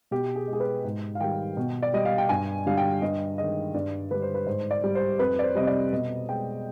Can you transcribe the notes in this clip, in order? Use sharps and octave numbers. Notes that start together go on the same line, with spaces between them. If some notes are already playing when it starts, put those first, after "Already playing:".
B2 G4
G#4
G#3
G#4
B4
G#2
F5
D#3 G3 G5
B2
D5
G3 D#5
F5
G5
G2 G#5
D3 G3 F5
G5
G2 D#5
D#3 G#3 D#5
G2 D5
D3 G3 B4
C5
B4
G#2 C5
D5
G3
C5
F2 B4
D5
C5
C3 G3 D#5
D5
B2 D#5
G#3 G5